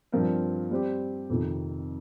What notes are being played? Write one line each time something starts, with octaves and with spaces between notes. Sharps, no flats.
G2 F3 C4 F4 A#4
G3 C4 G4
F2 C3 D#3